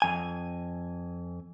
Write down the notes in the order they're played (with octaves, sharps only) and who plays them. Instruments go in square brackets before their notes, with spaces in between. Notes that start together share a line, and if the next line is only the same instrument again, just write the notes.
[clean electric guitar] F2 G#5